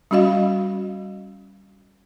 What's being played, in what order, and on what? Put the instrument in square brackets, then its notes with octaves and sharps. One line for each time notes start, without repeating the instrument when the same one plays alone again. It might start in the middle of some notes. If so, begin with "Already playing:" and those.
[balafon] G3 C#4 F#4 D#5 F5